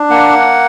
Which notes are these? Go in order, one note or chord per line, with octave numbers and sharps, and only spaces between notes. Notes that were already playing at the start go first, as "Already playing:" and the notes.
Already playing: D4
A#3 F#5